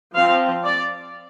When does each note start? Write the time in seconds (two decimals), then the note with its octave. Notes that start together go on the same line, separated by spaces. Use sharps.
0.15 F3 C4 F5
0.65 D5